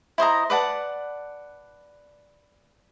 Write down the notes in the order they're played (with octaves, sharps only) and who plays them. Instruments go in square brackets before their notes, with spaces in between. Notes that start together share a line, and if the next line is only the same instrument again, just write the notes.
[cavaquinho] E4 C5 D#5 A#5
B4 D5 F#5 A5